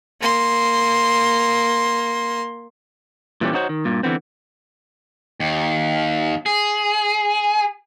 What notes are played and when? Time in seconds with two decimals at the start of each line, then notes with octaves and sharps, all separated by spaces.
0.21 A#3 C6
3.41 A#2 E3 G3 C#4 G4
3.53 B3 C#4 D#4 F#4 C5 C#5
3.69 D#3
3.85 G2 A#2
4.03 D3 E3 B3 C4
5.40 D#2
6.46 G#4